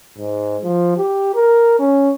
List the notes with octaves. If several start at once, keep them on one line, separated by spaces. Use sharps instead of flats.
G#2
F3
G4
A#4
C#4